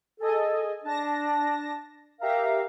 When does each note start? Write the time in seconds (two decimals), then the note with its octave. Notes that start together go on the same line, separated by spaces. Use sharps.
0.20 G#4 A4 D#5 G#5
0.85 D4 A5 A#6
2.21 G4 A#4 E5 F5 A#5